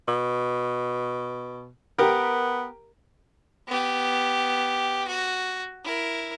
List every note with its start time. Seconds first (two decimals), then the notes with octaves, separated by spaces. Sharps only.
0.08 B2
1.99 B3 G4 A#4
3.68 B3 G4
5.08 F#4
5.84 E4 A#4